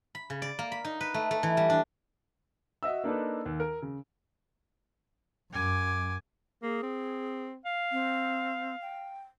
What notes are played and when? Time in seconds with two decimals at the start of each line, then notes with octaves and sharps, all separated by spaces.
0.15 B5
0.30 C#3
0.42 D5
0.59 A#3
0.72 B5
0.85 D#4
1.01 B4
1.14 A3
1.31 A3
1.43 E3
1.57 G3
1.70 D4
2.83 F#4 D#5 E5 E6
3.04 A#3 D4 D#4 A4 B4
3.46 D#2
3.60 A#4
3.82 C#3
5.52 F#2 G#5 D6
6.63 A#3 G#4
6.83 C4
7.65 F5
7.92 C4
8.82 G5